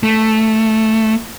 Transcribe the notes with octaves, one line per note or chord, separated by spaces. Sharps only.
A3